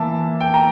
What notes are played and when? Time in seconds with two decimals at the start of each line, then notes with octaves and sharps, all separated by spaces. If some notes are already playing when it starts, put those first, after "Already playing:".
Already playing: E3 A#3 E5 A5
0.40 G5
0.54 A#5